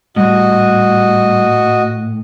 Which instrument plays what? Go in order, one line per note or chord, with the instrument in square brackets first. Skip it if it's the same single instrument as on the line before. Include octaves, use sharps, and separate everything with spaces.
[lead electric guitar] A2 [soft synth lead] G3 [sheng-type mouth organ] F#4 D#5